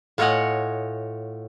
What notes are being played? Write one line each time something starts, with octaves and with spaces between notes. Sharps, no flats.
A2 F4 C#5 D#5 F#5 G#5